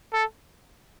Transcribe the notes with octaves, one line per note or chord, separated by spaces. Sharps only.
A4